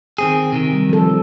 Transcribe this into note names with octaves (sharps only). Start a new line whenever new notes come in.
D#3 C4 G#4
C3 D#3
G3
F3 A4